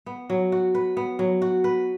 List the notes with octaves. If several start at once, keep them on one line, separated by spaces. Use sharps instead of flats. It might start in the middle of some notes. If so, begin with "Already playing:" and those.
B3
F#3
F#4
B4
B3
F#3
F#4
B4